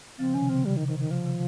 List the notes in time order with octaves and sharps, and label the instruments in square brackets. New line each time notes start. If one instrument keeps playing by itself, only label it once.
[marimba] C#3 F3 [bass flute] C4
[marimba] C3 D#3 [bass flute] C#4
[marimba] C#3 [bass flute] C4
[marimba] C#3 [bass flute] G3
[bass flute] D#3
[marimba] C3 [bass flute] D#3
[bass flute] D#3
[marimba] C#3 [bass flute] F3
[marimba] C3 D#3